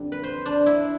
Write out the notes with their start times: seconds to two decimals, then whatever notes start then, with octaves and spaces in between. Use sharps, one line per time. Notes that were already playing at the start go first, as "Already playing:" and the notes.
Already playing: F2 D3 G3
0.12 B4
0.23 C5
0.46 D4
0.66 E4